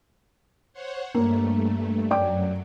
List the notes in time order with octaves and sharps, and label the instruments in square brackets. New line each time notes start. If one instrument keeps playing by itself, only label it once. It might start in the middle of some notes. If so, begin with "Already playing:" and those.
[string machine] C5 C#5 F#5
[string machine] G2 A3 [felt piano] A#3
[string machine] F#2 F#3 [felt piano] D5 G5 D6